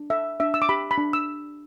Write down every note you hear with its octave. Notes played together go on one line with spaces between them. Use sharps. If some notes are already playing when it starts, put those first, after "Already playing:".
Already playing: D4
A4 E5
D4 E5
E6
D6
G4 B5
B5
D4
E6